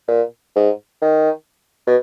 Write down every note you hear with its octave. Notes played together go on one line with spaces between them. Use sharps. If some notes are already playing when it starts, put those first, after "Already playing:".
A#2
G#2
D#3
B2